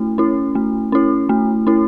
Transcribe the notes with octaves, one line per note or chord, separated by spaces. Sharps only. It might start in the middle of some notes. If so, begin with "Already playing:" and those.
Already playing: A3 C#4 E4
C#4 E4
A3
C#4 E4
A3
C#4 E4